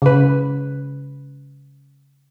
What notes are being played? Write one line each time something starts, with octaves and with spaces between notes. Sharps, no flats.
C#3 B4